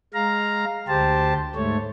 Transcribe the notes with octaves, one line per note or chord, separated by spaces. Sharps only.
G#3 F5 A#5
D2 G4 C5 A5
G#2 A3 C#5